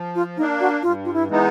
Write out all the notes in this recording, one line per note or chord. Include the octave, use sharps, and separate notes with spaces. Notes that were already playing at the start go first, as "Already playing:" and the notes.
Already playing: F3
F4
A#3 D4 D#4
F#4
G2 F4
F4
E4
E3 G#3 B3 D#4